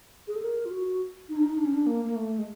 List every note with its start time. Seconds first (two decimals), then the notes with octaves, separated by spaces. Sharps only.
0.28 G#4
0.36 A4
0.42 A#4
0.65 F4
0.71 F#4
1.29 D#4
1.36 D4
1.43 D#4
1.58 D4
1.65 C#4
1.74 D4
1.86 A#3
2.05 A#3
2.16 A3
2.39 G#3